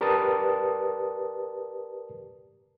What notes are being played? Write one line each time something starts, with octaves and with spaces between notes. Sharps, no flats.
G4 A#4 B4 D5 A5 D#6